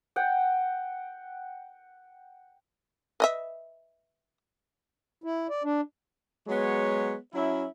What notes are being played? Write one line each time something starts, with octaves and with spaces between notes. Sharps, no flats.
F#5 G5
B4 D#5 E5
E4
D5
D4
F#3 G#3 B3 C#5
F#3 C#4 E4